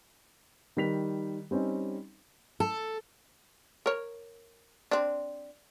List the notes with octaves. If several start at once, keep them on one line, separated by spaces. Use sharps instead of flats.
D#3 G3 B6 F7
G3 C4 C#4 D#4
A4
A#4 C#5
C4 D4